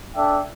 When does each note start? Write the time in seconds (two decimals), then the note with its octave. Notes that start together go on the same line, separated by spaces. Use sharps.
0.15 D4 A4 E5 G5